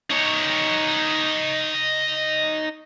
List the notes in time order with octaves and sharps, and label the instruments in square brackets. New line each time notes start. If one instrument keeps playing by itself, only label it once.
[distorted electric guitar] D#4 C#5